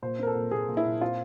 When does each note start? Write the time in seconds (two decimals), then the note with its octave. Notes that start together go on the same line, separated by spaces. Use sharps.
0.02 A#2 C5
0.19 C4 A#4
0.27 A4
0.35 A#2
0.51 A#2 G#4
0.68 A#2
0.77 E4
0.85 A#2
1.01 C4 F4